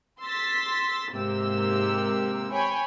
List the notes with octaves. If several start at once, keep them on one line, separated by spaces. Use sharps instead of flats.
C6 E6 A6 B6
G#2 C3 A#3 G4 E6
C#5 G5 G#5 B5